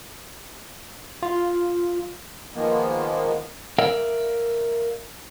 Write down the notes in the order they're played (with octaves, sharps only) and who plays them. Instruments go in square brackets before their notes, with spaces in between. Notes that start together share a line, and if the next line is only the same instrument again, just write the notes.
[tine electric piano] F4
[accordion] D#3 F3 G#3 A#3 B3
[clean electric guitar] A#4 D5 E5 F5